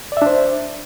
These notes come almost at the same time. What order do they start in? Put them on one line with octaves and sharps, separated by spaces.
D5 E5 D4 C5